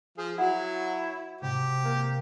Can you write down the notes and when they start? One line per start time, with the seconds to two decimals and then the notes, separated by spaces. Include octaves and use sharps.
0.18 F3 G#4
0.38 F#3 E4 F#4 F#5
1.41 G#2 C3 G4
1.85 A#3 F5